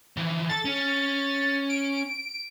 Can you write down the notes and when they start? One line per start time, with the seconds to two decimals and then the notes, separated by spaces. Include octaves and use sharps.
0.17 E3 F3
0.49 A4 A6
0.65 C#4
1.70 D7